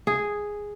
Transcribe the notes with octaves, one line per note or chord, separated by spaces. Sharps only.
G#4